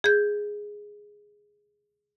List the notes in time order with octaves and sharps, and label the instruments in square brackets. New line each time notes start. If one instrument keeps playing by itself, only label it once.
[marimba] G#4 G6